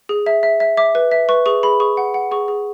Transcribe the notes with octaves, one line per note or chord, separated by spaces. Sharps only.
G#4
E5
E5
E5
E5 D6
B4
E5
B4 C#6
G#4 C#6
G#4 B5
G#4 C#6
F#5
F#5
G#4 C#6
G#4